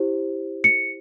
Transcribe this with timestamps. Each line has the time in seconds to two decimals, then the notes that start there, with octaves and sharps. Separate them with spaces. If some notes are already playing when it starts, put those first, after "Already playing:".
Already playing: E4 G4 C5
0.64 C#7